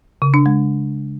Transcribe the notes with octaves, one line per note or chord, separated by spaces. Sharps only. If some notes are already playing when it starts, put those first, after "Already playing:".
C#3
D4
G#3